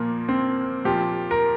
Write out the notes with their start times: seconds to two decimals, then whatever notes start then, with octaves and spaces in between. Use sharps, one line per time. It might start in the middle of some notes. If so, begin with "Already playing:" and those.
Already playing: A#2 F3 A#3
0.29 C4
0.85 A#2 F3 G4
1.31 A#4